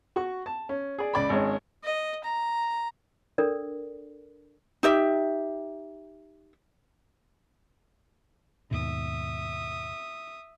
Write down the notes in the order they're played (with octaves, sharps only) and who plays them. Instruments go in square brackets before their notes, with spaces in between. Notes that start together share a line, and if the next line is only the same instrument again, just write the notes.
[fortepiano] F#4 C#6
A5
C#4
G#4 D5
C#2 D5 B5
G#1 G#3 C#4
[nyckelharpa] D#5
A#5
[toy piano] D4 A4 A#4 D5
[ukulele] D#4 G4 E5
[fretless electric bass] D#2 G#2 B2 [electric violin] E5 D#6